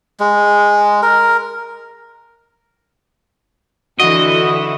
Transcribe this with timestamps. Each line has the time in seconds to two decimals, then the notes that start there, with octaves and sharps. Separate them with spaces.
0.20 G#3
1.02 A#4
4.00 D3 E3 E4 F#4 D#5